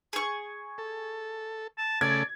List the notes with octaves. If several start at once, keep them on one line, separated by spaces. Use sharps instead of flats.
G#4 C#6
A4
A5
C#3 A3 D5 G#6